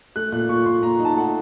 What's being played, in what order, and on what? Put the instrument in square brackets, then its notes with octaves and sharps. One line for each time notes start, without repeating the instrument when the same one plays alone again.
[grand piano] A3 F#6
A#2 F#6
A#2 C#6
A#2 C6
A#2 A#5
D#4
A5
A3 F#5